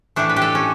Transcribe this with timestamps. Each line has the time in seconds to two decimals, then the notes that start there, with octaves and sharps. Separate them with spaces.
0.16 A2 E3 A3 D4
0.29 B4
0.36 G4
0.42 A4
0.55 C#4